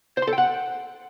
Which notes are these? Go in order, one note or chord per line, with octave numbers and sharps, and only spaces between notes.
C5
C6
A4
G5
F#5